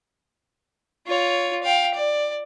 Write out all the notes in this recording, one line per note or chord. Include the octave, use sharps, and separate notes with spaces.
F4 C#5
F5 G5
D5